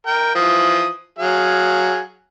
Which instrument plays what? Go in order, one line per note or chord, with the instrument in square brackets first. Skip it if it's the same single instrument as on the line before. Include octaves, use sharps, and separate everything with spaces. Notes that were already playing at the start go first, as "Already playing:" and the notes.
[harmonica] A#4 G5
E3 F3 D#6
F#3 G#4 F5